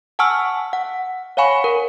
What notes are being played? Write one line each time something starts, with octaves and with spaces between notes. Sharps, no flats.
F#5 G#5 A5 C#6 E6 F6
F#5
C#5 F5 F#5 G#5 B5 C#6
A#4